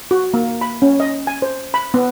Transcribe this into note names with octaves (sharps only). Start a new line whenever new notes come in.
F#4
A#3
B5
C#4
D#5
G#5
C5
B5
B3